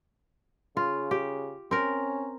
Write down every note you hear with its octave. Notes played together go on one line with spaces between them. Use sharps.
C#3 F4
G4
C4 C#4 A#4